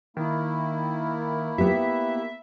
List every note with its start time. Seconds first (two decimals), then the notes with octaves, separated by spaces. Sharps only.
0.17 D#3 A#3 E4
1.58 B3 G4 E5